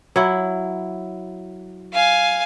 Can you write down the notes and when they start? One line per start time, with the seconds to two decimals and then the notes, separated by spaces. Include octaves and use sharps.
0.16 F#3 E4
1.93 F5 G#5